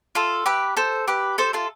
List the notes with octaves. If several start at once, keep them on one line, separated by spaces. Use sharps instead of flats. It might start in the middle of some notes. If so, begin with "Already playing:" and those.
F4 A4
G4 B4
A4 C5
G4 B4
A4 C5
F4 A4